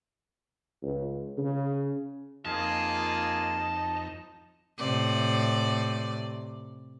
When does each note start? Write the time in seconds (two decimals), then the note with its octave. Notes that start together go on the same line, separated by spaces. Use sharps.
0.83 C#2
1.38 C#3
2.45 F2 A#3 D#4 F4 G#4 A5
4.79 A2 C3 D5